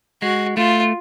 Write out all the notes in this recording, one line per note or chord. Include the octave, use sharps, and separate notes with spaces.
G#3 F#4
A3 F4